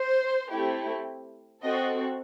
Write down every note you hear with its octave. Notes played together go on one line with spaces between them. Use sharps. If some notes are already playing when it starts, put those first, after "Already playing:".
Already playing: C5
A3 C4 E4 G4
C4 F#4 A4 D#5